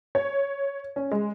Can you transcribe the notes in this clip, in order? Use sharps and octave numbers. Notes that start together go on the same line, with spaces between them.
C#5
C#4
G#3